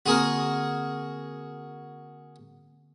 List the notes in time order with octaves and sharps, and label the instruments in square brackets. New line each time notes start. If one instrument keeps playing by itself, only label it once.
[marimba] D3 A#3 C4 [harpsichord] F#4 G#4 A#4